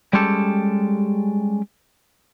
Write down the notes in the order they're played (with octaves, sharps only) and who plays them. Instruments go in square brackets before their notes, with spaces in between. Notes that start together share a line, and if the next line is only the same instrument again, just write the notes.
[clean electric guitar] G3 G#3 C#4 G4 A4